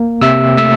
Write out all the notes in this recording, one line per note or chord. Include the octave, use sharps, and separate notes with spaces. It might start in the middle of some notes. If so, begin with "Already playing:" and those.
Already playing: A#3
C3 E5 E6
A3 E5 E6